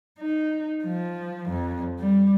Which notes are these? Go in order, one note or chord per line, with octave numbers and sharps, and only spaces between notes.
D#4
F3
F2
G3